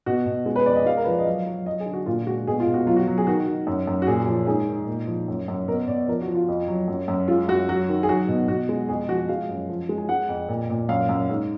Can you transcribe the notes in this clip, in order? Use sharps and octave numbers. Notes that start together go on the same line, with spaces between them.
B2 F#4
B2
G#3
B4
F2 D5
D#5
G#3 F5
A#4
B4
F3 D5
D#5
F#3 F5
F#3
F#3 D#5
G#4
D3
F#4
A#2 F4
G#3 F#4
B2 G#4
F4
B2
F#4
F#3 F4
F#4
F#3
G#4
D#3 F#4
D#3
F#2
F#2
F#4
A#2 G#4
F3
G#2 G#4
D#3
A#2
F3
F#2
F#2
B2 A#4
B2 D5
F3 A#4
F#4
F3
F4
F2
F#3
F#2
F#2
G#3 F4
F#2 F#4
F#3 F#4
D#3
G#4
F#3 F#4
B2
B2 F#4
G#3
F2 G#4
F3 F#4
G#3 F5
F#2
F3
G#3
G#5
G#3 F#5
F2
A#2
A#2
F#2 F5
F#2
G#2